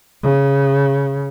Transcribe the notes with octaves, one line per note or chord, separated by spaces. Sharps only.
C#3